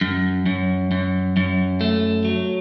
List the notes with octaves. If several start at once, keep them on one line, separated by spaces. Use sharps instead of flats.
F#2
F#2
F#2
F#2
A3
F#3